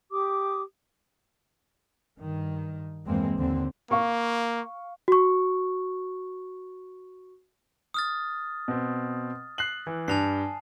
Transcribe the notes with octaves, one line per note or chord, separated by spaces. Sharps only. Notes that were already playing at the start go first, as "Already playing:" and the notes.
G4 D6 D#6
G2 D#3
E2 G2 E3 G#3 A#3 C4
D#2 D3 C4
A#3 F5 C#6
F#4 C#6
D#6 F6 A6
B2 C4
F#6 C7 F#7
E3
G2 G#5 A5 C7 F7